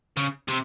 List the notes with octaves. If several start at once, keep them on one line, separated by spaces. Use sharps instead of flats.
C#3
C3